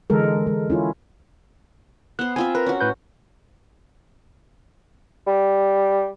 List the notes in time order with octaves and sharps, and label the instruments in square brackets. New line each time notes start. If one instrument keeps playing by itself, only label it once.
[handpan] D3 E3 G#3 A4 A#4
G#3
C#4 E4 F4
[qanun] B3 C5 [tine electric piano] F#6
[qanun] C4 F4 E5 [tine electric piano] G#5
[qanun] A#4 [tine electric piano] B4
[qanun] C#4 F#4
[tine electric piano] A2 B4 G6
[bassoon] G3